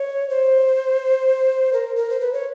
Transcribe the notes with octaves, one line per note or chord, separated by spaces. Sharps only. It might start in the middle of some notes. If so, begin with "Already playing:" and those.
Already playing: C#5
C5
A#4
A#4
C5
B4
C#5